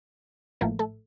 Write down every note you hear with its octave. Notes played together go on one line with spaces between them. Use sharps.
A1 A2 F3 A3 A#3 A#4
A3 A4